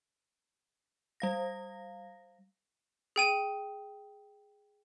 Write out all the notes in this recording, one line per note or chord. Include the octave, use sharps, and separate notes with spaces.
G3 F5 A#6
G#4 G5 D#7